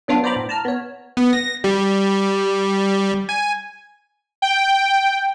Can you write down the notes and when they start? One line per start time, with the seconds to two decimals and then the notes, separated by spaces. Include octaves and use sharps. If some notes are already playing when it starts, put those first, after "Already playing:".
0.08 F#3 B3 D4 F4
0.23 B3 C5 D5 A#5 B5 D6
0.36 A2
0.49 A5 A#5 F6
0.65 B3 C#5
1.17 B3
1.33 A#6
1.64 G3
3.29 G#5
4.42 G5